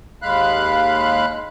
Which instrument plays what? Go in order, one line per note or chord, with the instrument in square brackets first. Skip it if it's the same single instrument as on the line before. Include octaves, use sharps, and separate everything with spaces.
[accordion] D#2 G#3 F5 B5 F#6